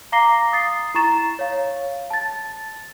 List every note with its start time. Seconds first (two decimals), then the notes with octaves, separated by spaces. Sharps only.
0.12 F5 A#5 D6 A#6 C7 G7
0.52 D#6 A6 C7
0.94 E4 A#5 C#6 A6 E7
1.39 C#5 F5
2.10 A5 A6